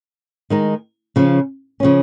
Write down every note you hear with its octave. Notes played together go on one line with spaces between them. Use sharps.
D#3 G#3 D#4
C#3 F3 C#4
C#3 F3 C#4